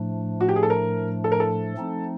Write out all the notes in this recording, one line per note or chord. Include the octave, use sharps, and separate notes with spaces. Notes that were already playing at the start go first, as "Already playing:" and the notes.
Already playing: A2 F3 A3 D4
F#4
G4
G#4
A4
A#4
A4
A#4
A4
F3 A3 C4 D#4